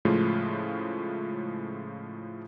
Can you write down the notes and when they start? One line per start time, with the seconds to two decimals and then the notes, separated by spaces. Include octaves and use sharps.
0.05 A2 C#3 F3 G#3 A3 F4